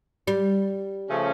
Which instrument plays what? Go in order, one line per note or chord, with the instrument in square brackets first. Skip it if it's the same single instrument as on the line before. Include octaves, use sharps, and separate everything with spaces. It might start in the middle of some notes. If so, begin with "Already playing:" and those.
[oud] G3
[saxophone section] C#3 F3 A3 C#4